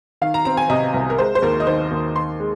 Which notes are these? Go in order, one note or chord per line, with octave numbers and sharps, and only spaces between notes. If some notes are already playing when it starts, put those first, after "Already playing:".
D#3 F5
A#5
C4 A#5
G#5
C3 D#5
C2
A#4
G#3 C5
C5
D#2 A#4
D#5
D#3 C5
D#2
D#3 C6
G#3